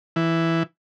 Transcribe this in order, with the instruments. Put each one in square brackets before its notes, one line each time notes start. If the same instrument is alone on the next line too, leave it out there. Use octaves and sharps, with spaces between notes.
[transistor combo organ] E3